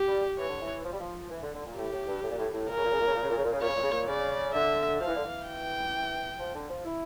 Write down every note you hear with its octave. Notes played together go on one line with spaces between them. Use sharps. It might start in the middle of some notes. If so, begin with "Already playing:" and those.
Already playing: G4
G3
E3 C#5
D3
E3
F3
G3
F3
E3
D3
D3
A#2
A2 G4
A2
G2
A2
A#2
A2
A2
A#2 A#4
C#3
A#2
C#3
A#2
C#3
A#2
C#3
A#2
C#3
A#2
C#3
A#2 C#5
C#3
A#2
C#3
A#2
C#3 D5
D3 E5
F3 F5
E3
D3
E3
G5
F3
D3
F3
E4